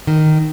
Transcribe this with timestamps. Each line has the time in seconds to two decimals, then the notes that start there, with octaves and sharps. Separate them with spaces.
0.07 D#3